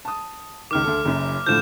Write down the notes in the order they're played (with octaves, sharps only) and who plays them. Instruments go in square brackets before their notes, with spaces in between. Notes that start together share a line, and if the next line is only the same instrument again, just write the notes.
[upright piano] A5 D#6
[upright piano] C#2 D#3 [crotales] D6 F6
[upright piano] D2 A4
F#1 F#2
[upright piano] A2 D3 F3 [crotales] G6 E7